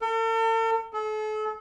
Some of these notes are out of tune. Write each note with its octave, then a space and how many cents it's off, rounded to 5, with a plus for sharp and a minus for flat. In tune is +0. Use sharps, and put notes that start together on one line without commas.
A4 +45
A4 -40